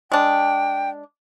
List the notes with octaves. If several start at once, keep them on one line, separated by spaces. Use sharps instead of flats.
G#3 D4 G5